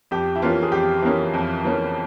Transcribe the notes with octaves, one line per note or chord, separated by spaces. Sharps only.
F2 G4
E4
E3 A#3 C#4 F4
G#4
F2 G4
E3 A#3 C#4
F2
E3 A#3 C#4